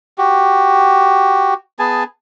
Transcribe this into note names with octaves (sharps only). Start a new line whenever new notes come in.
F#4 G4
B3 G#4 G#5 A5